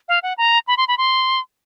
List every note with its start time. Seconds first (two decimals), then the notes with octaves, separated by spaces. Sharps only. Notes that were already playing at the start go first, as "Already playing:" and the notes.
0.08 F5
0.23 F#5
0.38 A#5
0.67 B5
0.77 C6
0.88 B5
0.98 C6